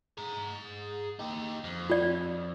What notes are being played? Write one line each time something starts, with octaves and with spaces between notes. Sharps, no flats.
G#4 A#5
D#4 G4
F2
F4 D5